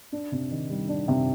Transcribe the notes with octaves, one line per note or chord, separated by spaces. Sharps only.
D4
C3
D#3
G3
D4
C3